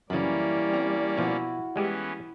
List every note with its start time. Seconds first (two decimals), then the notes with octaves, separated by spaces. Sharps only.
0.10 F#2 C#3 E3 G3 A#3 C#4 D5 B5
0.73 C4 A#5
1.17 B2 F3 E4 F#4
1.76 E3 G3 G#3 B3 C#4 G4